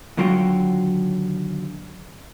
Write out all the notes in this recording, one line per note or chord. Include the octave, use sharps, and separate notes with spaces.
D#2 D3 F#3 F4 F#4 G5